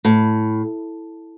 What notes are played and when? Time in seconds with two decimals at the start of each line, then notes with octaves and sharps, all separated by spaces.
0.05 A2